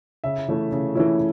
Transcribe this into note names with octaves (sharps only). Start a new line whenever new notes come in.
C#3 E5
E3 A3 C#4 E4
C#3
E3 A3 C#4 E4